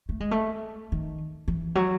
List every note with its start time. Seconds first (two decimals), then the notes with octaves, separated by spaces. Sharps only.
0.09 A3
0.20 G#3
0.31 A3
0.92 D#3
1.48 E3
1.75 F#3